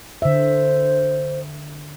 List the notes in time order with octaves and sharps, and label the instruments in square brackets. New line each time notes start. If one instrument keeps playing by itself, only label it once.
[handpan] D3 E5 [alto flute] C5